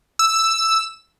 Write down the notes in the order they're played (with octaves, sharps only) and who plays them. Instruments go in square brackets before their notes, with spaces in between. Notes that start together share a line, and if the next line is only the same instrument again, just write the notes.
[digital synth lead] E6